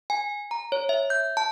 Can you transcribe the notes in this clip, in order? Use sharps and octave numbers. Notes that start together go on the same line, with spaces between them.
G#5
A#5
C#5
E5
G6
A5